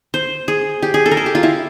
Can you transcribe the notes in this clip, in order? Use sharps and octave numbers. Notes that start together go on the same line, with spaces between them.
C5
G#4
G4
G#4
A4
A#4
A4
G4
F4
E4